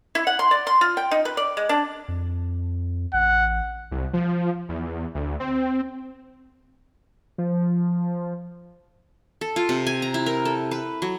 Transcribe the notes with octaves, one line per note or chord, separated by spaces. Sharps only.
E4
F#5
C6
D5
C6
F4
G5
D#4
B4
D5
G#3
D4
F2
A1 F#5
C2
F3
E2
D2
C4
F3
A4
F4
C3
G#5
A#5
E4
A#4
A4
B4
F#3